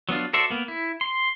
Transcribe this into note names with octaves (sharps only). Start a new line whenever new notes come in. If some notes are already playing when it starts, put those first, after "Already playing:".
F#3 B3 D4 F4
F#4 A4 C5 D5 E5
A#3 B3
E4
C6